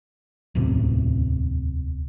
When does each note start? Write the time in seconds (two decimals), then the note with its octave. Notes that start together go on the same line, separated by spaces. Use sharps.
0.55 D1 A1 E2 C3